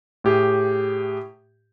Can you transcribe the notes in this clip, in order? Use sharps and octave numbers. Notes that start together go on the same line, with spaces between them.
A2 G4 G#4